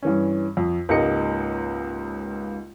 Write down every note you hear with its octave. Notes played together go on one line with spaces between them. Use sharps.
G2 E3 C#4
F2
C#2 G#2 A#3 G4 D#5 C#7